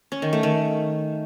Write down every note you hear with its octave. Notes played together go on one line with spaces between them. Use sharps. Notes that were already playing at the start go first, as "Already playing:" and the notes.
C#4
D#3
A3
D#3